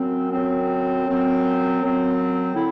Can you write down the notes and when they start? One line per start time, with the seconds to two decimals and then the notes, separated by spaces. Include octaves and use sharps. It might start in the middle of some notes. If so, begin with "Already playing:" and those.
Already playing: F#2 F#3 C4
0.32 F#2 F#3 C4
1.06 F#2 F#3 C4
1.81 F#2 F#3 C4
2.55 D3 E4